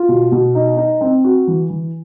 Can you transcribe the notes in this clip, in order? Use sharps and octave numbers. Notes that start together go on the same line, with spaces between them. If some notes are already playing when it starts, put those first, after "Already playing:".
Already playing: F4
B2
B2
D#4
D#4
C4
F#4
E3
E3